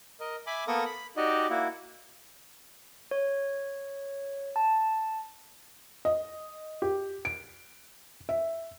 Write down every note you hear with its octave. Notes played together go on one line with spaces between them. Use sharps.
A#4 D#5
E5 G#5 B5 D6
A#3 B3 A4 A#4 C#6 D#6
B5
D#4 F#4 G4 D5 D#5
A#3 E4 F#4
C#5
A5
D#5
G4
D7
E5